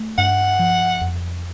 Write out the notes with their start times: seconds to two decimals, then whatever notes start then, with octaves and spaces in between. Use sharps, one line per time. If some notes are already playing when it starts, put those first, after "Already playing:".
Already playing: A3
0.18 G2 F#5
0.59 F3
1.01 F2